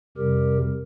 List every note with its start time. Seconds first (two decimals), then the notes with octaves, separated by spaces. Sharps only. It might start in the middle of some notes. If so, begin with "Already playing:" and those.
0.17 F2 C3 G3 G4 A#4